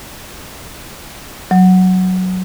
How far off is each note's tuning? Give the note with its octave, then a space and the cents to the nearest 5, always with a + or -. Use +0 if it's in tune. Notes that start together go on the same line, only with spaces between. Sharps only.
F#3 +0